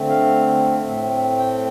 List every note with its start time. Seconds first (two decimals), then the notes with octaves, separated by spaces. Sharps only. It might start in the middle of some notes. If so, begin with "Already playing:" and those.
Already playing: D3 A3 C4
0.08 F5
0.79 A2 A3 C4
1.38 G5